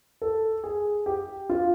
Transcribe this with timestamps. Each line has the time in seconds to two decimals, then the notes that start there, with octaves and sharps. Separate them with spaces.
0.22 A4
0.64 G#4
1.06 G4
1.50 F4